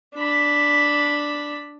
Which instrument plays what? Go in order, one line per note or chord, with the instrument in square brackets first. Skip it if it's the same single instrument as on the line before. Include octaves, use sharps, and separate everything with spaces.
[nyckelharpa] D4 B5